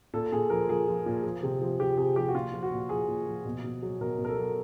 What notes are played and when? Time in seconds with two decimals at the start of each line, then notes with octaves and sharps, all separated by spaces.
0.14 A#2 A4
0.32 A#2 G#4
0.50 F3 A#4
0.69 F3 G#4
0.88 F3
1.06 A#2
1.24 F3
1.43 C3
1.61 F3
1.79 F3 G4
1.97 C3 G#4
2.16 F3 G4
2.28 F#4
2.34 A#2 F4
2.54 F3
2.63 F#4
2.72 A#2
2.89 F3 G#4
3.08 A#2
3.27 F3
3.45 B2
3.64 B2
3.82 F#3
4.01 B2 A#4
4.18 B2
4.25 A#4
4.29 A4
4.37 F#3